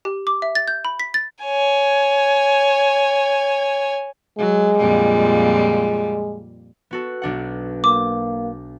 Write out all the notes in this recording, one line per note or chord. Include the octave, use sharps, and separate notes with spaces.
G4
D6
E5
A6
G6
B5
B6
A6
C#5 G#5
F#3 G#3
F2 A#2 G3
B3 F#4 A4
B1 D4 F#5
A#3 D6